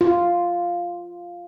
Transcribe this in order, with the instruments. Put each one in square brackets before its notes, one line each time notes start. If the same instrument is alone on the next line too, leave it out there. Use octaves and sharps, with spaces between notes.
[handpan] F4